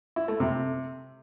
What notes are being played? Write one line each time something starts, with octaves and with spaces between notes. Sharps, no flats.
E4
A3
C3